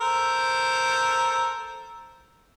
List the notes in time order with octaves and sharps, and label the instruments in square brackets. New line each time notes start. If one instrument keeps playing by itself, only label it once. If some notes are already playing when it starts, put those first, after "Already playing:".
[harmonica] A4 A#4 C5